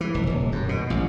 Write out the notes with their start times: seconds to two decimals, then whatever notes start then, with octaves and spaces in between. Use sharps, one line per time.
0.01 E3
0.14 F1
0.27 D#1
0.52 F#2
0.69 B2
0.90 A1